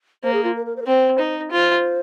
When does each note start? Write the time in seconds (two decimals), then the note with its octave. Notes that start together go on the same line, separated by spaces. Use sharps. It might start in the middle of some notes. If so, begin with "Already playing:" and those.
0.23 A#3 C5
0.33 G#4
0.44 F4
0.56 A#4
0.66 A#4
0.76 C5
0.82 A#4
0.87 C4 C5
1.19 D#4
1.52 F4 C5